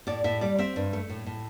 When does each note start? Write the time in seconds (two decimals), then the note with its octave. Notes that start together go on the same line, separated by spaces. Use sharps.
0.07 A2 D5
0.24 A2 E5
0.41 G3 D5
0.58 C4 E5
0.76 G2
0.93 A3
1.09 A2
1.26 A2